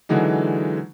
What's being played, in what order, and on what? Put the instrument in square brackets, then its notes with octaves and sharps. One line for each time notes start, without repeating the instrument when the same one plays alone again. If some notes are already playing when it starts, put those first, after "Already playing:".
[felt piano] D3 E3 F#3 G#3 D#4